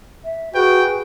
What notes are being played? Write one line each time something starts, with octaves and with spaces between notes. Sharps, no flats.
E5
F#4 G#4 B4 G5